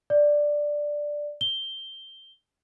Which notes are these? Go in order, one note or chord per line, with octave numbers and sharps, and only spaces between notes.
D5
G7